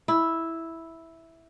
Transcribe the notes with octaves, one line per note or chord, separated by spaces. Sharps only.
E4